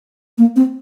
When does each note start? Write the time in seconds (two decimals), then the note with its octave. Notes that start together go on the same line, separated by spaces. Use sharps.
0.38 A#3
0.56 C4